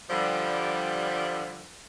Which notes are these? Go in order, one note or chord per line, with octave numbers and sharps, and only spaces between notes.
D3 F3 G3